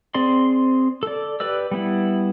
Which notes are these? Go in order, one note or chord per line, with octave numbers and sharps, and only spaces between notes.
C4 G#4 D5 C6
A4 D5
G4 B4 D5 E6
G3 B3 E4